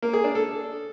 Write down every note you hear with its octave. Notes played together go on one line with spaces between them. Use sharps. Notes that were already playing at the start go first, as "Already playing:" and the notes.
A#3
G#4
D4
A4